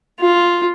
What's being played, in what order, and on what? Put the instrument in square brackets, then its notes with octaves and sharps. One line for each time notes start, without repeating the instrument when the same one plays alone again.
[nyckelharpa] F4